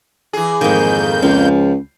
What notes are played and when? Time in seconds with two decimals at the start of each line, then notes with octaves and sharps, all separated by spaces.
0.33 E3 G#4
0.61 F2 G#2 D#3 A#3 G6
1.22 C#2 F3